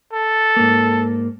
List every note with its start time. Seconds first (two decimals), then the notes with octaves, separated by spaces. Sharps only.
0.13 A4
0.56 G#2 A#3